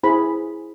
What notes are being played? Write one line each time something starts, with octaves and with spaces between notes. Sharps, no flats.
E4 G#4 C5 B5